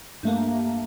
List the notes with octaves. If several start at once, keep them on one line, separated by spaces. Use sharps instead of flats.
G2 A3 A#3